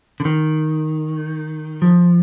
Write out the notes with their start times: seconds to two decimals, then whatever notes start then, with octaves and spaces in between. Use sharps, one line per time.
0.20 D3
0.25 D#3
1.82 F3